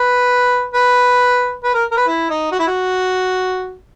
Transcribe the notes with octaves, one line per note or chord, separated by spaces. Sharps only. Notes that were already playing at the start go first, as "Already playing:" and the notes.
Already playing: B4
B4
B4
A#4
A#4
B4
E4
D#4
F#4
E4
F#4